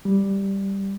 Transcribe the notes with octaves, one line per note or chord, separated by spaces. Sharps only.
G3